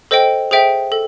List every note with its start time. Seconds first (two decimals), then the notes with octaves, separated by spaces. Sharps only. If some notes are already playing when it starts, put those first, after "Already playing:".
0.11 A4 C5 D#5 G5
0.51 G#4 C5 E5 G5
0.92 A4